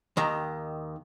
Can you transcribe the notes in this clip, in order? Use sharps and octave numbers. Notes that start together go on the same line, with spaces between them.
D#2 D#3 A#5